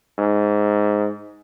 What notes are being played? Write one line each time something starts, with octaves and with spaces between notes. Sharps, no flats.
G#2